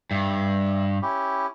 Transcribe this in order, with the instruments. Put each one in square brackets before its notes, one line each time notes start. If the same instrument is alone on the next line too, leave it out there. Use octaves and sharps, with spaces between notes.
[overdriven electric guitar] G2 [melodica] E5
[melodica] C#4 E4 G4